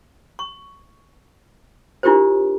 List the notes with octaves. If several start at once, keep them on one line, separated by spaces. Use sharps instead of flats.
C#6
D4 E4 F4 G4 A#4 C5